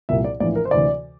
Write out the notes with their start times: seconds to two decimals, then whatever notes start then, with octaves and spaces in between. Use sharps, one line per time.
0.09 C2 A#2 F3 E5
0.24 D5
0.40 A#1 A2 E3 D5
0.56 A#4
0.65 C5
0.71 D2 C3 E3 D5